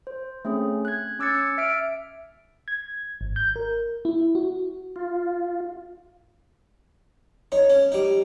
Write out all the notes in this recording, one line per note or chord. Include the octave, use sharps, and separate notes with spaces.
C5
A3 C4 C#4 G#4
F#6 G#6
C#4 D6 E6 G#6 A6 C#7
E5 E6 F6 D7
G#6
G#1
G6
A#4
E4
F#4
F4
D#4 C#5
C#4
G3 D#4